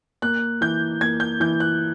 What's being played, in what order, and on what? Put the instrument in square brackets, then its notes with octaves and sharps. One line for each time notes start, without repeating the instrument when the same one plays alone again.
[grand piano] A#3 F#6
E3 G6
A#3 G#6
G6
E3 G6
F#6